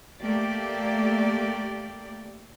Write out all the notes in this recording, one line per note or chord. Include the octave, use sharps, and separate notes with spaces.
A3 A#3 G4 D5